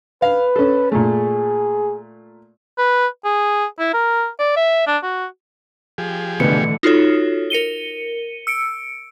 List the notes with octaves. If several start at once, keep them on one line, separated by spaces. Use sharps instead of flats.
B4 F5
C#4 A4
A#2 A3 G#4
B4
G#4
E4
A#4
D5
E5
D4
F#4
F3 G4 G#4
B2 D3 E3 A3 B4 C#7
D#4 F4 F#4 A4 C#5
A#4 C#7 D#7 G7
E6 C#7 D7